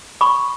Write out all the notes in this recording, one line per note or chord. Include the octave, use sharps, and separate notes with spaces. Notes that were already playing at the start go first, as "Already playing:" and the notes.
B5 C#6